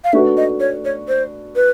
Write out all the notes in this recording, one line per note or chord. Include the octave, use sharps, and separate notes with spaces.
F5
A3 D4 F#4 B4 E5
D#5
C#5
C#5
C5
B4